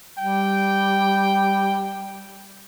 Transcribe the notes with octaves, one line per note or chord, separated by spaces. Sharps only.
G3 G5